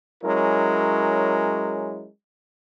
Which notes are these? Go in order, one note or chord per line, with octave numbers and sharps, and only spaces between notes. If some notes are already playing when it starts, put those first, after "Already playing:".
F#3 G#3 C#4 E4 A#4